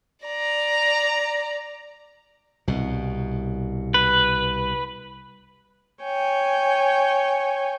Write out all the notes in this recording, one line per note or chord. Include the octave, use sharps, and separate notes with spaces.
D5 A#5
C2 B2
B4
C#5 G5 G#5